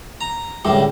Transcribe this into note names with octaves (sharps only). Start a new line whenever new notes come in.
A#5
C#2 A2 D3 G3